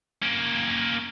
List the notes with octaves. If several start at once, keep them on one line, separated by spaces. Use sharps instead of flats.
A#3 C#4